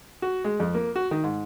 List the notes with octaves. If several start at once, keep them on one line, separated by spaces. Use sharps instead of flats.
F#4
G#3
F2
A#3
F#4
D#3
G#2